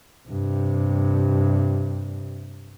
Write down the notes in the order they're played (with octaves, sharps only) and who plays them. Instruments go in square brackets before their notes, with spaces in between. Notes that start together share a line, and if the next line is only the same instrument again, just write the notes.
[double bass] G2 C3